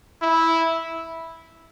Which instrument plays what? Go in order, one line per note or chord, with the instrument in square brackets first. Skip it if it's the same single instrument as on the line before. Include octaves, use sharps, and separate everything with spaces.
[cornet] E4